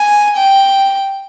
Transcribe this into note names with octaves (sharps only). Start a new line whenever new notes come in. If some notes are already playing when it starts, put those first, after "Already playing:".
Already playing: G#5
G5